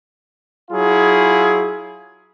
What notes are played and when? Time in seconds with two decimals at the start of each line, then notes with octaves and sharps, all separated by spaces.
0.71 F#3 E4 F4 G#4